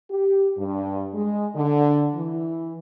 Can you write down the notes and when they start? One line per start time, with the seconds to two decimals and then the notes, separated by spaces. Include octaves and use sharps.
0.11 G4
0.58 G2
1.14 G#3
1.55 D3
2.15 E3